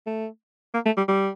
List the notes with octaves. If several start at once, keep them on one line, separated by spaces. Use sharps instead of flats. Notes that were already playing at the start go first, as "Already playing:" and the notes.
A3
A#3
A3
G3
G3